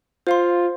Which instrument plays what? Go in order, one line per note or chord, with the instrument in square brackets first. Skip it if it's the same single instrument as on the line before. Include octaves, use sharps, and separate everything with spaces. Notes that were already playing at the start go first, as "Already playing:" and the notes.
[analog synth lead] F4 [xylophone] C5 F5 C6